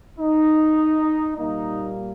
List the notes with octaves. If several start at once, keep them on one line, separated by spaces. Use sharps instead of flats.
D#4
A#2 G3 A#3 D#4